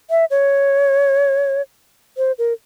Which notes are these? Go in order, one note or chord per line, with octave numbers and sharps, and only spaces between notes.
E5
C#5
C5
A#4